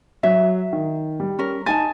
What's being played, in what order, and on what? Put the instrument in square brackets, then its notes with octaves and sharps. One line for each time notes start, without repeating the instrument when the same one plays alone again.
[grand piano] F#3 [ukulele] E5
[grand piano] D#3
G3
[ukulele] C#4 A#4
[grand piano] D#4 A6 [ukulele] G#5 A5